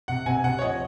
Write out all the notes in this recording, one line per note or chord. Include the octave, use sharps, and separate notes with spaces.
C3 F#5
C3 G#5
C3 F#5
C#5
F3 D#5